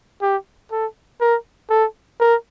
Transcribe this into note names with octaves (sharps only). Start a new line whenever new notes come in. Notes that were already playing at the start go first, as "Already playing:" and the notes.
G4
A4
A#4
A4
A#4